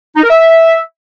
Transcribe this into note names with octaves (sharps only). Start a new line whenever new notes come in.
D#4
A#4
E5